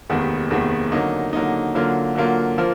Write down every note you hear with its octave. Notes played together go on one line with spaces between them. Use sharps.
F1 D#2 D#3 G#3 B3
F1 D#2 D#3 G#3 B3
D3 F#3 A#3 D#4
D3 F#3 A#3 D#4
D3 F#3 A#3 F4
D3 F#3 A#3 F4
F3 A#3 F4